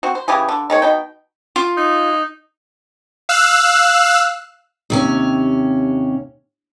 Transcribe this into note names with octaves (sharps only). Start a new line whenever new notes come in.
C4 F#4
C5
C#3 E3 G4 G#4
D3
D#3 G#3 C#5
B2 D#4 G5
F4
D#4
F5 E6 F#6
D#2 C3 C#4